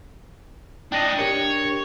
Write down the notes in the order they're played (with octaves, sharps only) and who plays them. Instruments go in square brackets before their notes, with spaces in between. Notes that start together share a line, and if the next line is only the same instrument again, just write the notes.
[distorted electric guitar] D4 D#5 [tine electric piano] G5 A#6
[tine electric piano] D4 G4 A#4 [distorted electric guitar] C#5